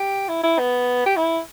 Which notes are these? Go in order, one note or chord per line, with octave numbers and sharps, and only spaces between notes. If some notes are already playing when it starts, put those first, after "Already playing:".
Already playing: G4
E4
E4
B3
G4
E4